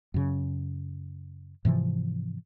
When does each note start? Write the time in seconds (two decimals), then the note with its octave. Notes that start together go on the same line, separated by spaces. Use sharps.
0.14 F#2 C#3
1.65 G#2 C3 E3 F3